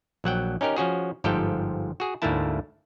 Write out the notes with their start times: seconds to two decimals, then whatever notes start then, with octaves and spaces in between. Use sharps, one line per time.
0.24 A#1 F#3 F#5 G5
0.61 C#4 D#4 G4 A#4
0.77 F3 C#4 F#4 G#4
1.24 G1 G#2 F3 G4 A4 G5
2.00 F#4 G#4
2.22 D2 G#2 A3 A#3 E4 A5